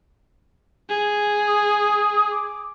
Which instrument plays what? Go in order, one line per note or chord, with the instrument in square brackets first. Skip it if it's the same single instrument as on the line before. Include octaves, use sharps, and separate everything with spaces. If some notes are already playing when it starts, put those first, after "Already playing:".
[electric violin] G#4
[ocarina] D#6
D6